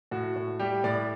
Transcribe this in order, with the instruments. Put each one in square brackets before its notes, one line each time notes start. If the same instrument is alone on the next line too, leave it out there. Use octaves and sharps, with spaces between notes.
[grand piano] A2 F#4
A2
G3 G4
A2 D5